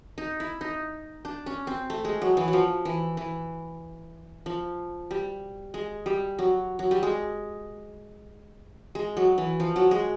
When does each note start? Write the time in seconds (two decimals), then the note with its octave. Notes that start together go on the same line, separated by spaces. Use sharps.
0.18 D#4
0.40 E4
0.61 D#4
1.25 D4
1.46 C#4
1.67 C4
1.90 A3
2.05 G#3
2.22 F#3
2.37 E3
2.48 F#3
2.53 F3
2.85 E3
3.17 E3
4.46 F3
5.11 G3
5.74 G#3
6.06 G3
6.39 F#3
6.79 F#3
6.91 G3
7.03 G#3
8.95 G#3
9.17 F#3
9.38 E3
9.60 F3
9.76 F#3
9.91 G#3